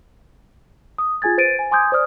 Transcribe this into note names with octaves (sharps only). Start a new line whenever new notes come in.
D#6
F4 G#4 G#5 G#6 A6
B4 C5 A6 D7 D#7
G#5
G#5 C6 D6 D#6 G6 G#6
C5 D5 D#6 F6